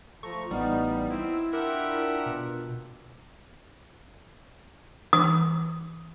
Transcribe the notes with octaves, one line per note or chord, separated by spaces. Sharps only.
F3 A3 A#5 C#6
A1 G3 B3 D#4 F5
C4 E4
E6
D4 F4 G4 A#4 E5 F#5
B2
E3 D#6